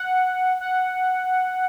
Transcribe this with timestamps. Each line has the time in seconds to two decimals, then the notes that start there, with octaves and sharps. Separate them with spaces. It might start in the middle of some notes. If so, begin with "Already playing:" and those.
Already playing: F#5
0.60 F#5